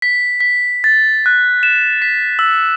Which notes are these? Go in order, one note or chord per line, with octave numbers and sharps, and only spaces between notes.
B6
B6
A6
F#6
E7
B6
E6